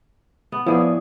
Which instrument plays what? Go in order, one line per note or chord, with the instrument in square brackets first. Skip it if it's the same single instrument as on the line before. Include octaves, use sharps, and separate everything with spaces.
[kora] B3
[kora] A2 G#4 [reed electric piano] F3 B3 D5